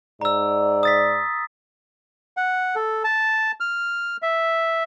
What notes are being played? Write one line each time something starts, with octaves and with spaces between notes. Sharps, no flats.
G#2 D5 A#5 E6
D#6 A6 B6
F#5
A4
A5
F6
E5